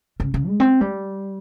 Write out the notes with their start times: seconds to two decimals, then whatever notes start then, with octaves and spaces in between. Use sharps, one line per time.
0.20 C#3
0.34 C#3
0.47 G#3
0.60 C4
0.81 G3